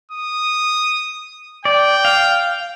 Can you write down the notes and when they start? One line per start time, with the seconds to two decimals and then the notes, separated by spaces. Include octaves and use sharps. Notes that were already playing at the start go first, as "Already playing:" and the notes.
0.12 D#6
1.65 D5 G5
2.05 F5